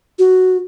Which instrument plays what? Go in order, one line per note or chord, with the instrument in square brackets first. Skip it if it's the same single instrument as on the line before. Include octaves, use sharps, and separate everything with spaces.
[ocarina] F#4